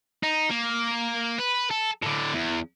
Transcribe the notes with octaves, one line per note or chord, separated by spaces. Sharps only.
D#4
A#3
B4
A4
A2 D3
E2